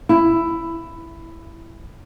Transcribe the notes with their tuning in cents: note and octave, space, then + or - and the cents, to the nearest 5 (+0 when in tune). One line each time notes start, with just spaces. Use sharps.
E4 +10